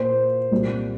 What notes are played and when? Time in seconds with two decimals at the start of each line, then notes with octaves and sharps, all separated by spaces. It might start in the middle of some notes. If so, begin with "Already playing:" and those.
Already playing: A#2 A#3 C5
0.51 C2 A#2 G3